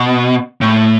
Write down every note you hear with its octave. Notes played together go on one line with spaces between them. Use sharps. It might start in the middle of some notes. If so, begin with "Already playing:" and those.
Already playing: B2
A2